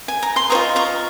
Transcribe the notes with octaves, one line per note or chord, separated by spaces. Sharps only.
G#5
A#5
C6
C5 D#5 A#5 C#6
F4
A#5 C#6